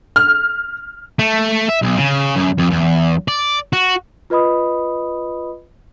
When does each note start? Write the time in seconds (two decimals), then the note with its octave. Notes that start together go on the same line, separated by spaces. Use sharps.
0.16 F6
1.19 A3
1.69 E5
1.82 B1
1.97 C#3
2.36 F#2
2.59 F2
2.71 E2
3.28 D5
3.73 F#4
4.30 F4 B4 D#5 B5 D#6